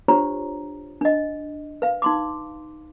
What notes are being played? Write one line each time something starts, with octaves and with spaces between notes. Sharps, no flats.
D4 F4 G4 C5 C#5 A#5
D4 D#5
B4 F5
D#4 C6 D6